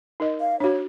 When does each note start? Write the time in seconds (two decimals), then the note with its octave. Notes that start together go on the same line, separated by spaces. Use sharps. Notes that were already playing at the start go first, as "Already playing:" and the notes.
0.20 D#4 A#4 D#5
0.40 F5
0.60 D4 F#4 C#5